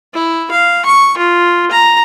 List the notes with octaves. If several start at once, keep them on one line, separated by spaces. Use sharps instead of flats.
E4
F5
C#6
F4
A#5